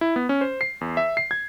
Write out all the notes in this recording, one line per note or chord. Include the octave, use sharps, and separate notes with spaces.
E4
B3
C#4
C5
C7
E2
E5
C7
G#6